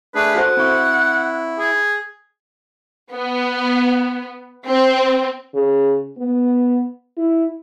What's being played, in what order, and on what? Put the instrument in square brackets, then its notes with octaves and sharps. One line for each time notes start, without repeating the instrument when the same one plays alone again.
[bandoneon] A3 D4 G#4 [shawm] B4
[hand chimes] F#4 A4 C5 [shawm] F#5
[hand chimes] C4 C#6 [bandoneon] E4
[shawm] G#4
[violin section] B3
C4
[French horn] C#3
B3
E4